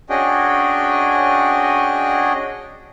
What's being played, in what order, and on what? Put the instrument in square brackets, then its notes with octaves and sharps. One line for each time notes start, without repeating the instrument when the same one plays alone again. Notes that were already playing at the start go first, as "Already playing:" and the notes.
[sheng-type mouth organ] C#4 D4 F#4 G#4 D#5 G5